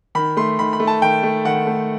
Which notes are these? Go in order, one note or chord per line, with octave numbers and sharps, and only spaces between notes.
D#3 B5
A3 C6
D#3 B5
B5
A3
A5
D#3 G5
A3
D#3 F#5
A3